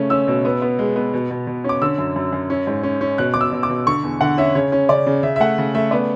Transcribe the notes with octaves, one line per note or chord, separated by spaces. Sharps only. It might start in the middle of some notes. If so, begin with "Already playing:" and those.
Already playing: C#3 A3 C#4
C#4 E6
B2
B3
B3
G#3
B3
B2
B2
B2
C#4 D6
D3 E6
F#2
F#2
F#2
C#4
G#2
C#4
C#4
B2 F#6
B2 D6
E6
B2
D6
B2
D3 C#6
E2
D3 F#5
C#4 E5
C#3 C#5
C#4
C#3 D5
C#3
C#3 E5
E5
A3 F#5
C#3
A3 E5
B3 D5